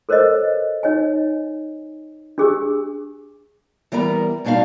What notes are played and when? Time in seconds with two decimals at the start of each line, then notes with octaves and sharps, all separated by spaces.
0.09 A4 A#4 C5 C#5 D#5
0.83 D#4 C#5 D#5 G#5
2.38 D4 G4 G#4 G#5 D6 E6
3.92 E3 G3 B3 A#4 A#5
4.45 G2 B2 D4 D#4 F5